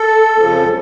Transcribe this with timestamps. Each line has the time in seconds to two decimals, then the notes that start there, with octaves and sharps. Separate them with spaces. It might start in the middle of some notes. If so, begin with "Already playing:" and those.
Already playing: A4
0.38 F2 C#3 F3